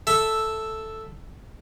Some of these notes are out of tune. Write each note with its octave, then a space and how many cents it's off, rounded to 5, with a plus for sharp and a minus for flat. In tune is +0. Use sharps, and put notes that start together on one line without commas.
A4 +0 E5 +0